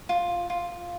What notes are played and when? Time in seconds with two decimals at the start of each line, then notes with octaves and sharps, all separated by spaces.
0.09 F4
0.50 F4